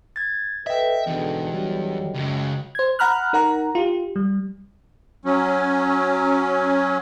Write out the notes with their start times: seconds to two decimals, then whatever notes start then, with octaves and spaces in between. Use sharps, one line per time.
0.16 G#6 A6
0.67 A4 B4 D#5 E5 G5
1.07 E2 G#2 B2 D3
1.53 D3 F#3 G3
2.14 C#2 F#2
2.75 C5 G#6
2.99 F#5 A#5 B5 F6 F#6
3.33 D#4 A#4 F#5 A#5
3.75 F4 G4
4.16 G3
5.25 F#3 C#4